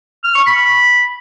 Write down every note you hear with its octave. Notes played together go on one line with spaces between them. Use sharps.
F6
C#6
B5